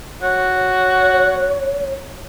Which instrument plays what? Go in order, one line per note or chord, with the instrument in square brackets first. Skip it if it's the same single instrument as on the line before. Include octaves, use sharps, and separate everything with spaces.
[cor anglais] F#4 [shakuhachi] C#5